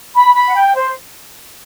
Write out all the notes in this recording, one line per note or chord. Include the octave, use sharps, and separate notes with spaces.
B5
B5
F#5
G5
C5